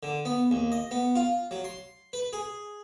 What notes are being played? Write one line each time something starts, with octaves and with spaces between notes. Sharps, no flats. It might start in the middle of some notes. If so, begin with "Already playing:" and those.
D3
B3
D#2
D#5
B3
F4
F#3
C6
B4
G#4